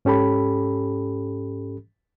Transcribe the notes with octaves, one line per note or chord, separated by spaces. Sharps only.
G#2 C#4 G4 A4 B5